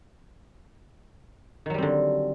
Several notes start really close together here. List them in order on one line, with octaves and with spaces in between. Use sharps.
D#3 F#3 G3 C4 D3